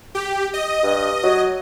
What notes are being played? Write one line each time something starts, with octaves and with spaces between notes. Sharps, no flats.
G4
D#5
G2
F#3